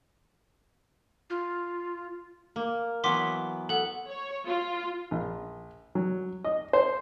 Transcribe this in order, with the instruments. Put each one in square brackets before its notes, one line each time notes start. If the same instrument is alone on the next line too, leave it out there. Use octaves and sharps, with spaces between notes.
[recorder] F4
[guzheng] A#3
[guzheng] E3 F#3 B3 [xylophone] C6 D6 B6
[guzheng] B3 [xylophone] A4 F#5
[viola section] C#5
F4
[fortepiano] A#1
F#3
D#5
C5